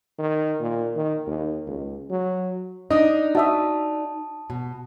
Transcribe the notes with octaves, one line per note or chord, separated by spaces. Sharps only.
D#3
A#2
D#3
D#2
C#2
F#3
D4 D#4 D#5
F#4 E5 A5 D#6
B2